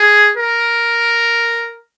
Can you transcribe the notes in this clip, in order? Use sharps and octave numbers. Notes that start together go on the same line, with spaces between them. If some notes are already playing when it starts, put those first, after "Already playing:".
Already playing: G#4
A#4